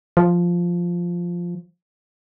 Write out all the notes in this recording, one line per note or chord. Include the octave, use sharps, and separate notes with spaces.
F3